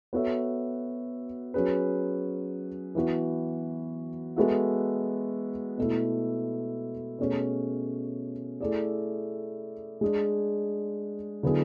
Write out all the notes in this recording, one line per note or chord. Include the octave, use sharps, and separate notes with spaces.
B3 F#4 A4 C#5 E5
F#3 C#4 G#4 B4
E3 B3 F#4
G#3 B3 F#4 A4 E5
B2 A3 E4
B2 A3 C#4 G#4 C#5
A3 E4 G#4 D5
G#3 D4 G#4
D3 F#3 B3 E4 G#4